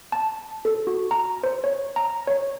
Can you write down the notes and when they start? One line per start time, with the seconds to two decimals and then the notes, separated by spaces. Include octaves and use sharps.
0.12 A5
0.65 A4
0.87 F#4
1.11 A#5
1.43 C5
1.64 C#5
1.96 A#5
2.27 C#5